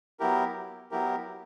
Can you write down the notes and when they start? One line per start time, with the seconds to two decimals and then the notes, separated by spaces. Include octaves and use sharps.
0.20 F#3 B3 E4 G4 A#4
0.91 F#3 B3 E4 G4 A#4